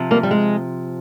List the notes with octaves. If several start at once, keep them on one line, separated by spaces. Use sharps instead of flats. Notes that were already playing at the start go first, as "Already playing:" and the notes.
Already playing: C3 F3
G3 A#3
G3
G#3